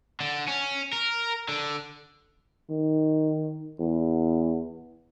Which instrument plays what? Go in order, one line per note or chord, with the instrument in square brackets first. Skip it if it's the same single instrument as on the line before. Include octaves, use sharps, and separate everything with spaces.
[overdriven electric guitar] D3
C#4
A#4
D3
[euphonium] D#3
E2